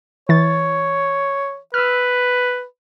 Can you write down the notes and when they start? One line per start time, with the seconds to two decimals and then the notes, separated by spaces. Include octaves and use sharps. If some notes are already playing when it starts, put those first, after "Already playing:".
0.29 E3 C#5 A6
1.74 B4 E6 F6